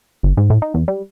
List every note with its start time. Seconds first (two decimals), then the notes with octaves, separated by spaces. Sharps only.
0.23 G1
0.37 G#2
0.50 A2
0.62 D#4
0.74 E2
0.88 G3